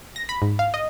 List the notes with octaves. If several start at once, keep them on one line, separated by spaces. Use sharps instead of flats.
A#6
B5
G#2
F5
D#5